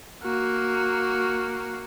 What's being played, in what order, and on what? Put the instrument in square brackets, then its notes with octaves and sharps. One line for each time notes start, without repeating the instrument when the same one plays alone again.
[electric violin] A#3 F#4